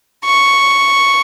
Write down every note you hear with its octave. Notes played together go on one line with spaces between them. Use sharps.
C#6